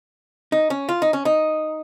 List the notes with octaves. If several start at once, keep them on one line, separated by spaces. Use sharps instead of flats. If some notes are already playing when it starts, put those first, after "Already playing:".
D#4
C#4
F4
D#4
C#4
D#4